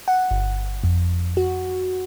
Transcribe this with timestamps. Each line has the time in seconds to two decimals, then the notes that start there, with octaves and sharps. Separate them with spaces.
0.08 F#5
0.31 G1
0.84 F2
1.37 F#4